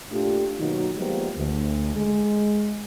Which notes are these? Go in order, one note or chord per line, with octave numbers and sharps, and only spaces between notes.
A#2 A3 D4 F4 G4
B2 D#3 F#3 A#3 D#4 F#4
F3 G3 G#3 A#3 B3 G4
D2
G#3